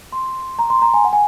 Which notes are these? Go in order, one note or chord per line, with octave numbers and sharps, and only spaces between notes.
C6
A#5
C6
A#5
G#5
F#5
G#5